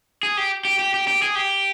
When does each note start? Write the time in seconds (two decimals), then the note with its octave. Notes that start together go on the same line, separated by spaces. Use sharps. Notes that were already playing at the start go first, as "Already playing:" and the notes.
0.23 G#4
0.37 G4
0.65 G4
0.79 G4
0.94 G4
1.08 G4
1.22 G#4
1.35 G4